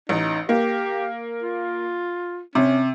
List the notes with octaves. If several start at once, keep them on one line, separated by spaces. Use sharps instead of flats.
A1 D#4
A#3 G4
F4
C3 C#4